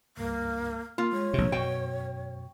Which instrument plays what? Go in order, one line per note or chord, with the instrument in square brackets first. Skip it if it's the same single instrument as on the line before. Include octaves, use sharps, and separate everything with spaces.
[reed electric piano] C#2 G2 [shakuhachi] A#3
[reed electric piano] A#3 [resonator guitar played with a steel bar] F4
[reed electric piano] G#3 [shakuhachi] C#5
[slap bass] A#1 C3
[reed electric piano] F#2 C#6 [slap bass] B2 [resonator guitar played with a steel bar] G5